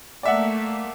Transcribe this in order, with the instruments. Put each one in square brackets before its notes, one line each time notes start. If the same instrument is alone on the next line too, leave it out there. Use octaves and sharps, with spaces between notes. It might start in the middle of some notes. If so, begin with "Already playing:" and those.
[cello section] A3 A#3 [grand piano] D5 E5 F#5